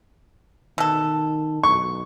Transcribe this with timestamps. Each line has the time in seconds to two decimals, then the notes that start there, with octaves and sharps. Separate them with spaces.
0.78 B2 D#3 A4
1.64 B1 C#6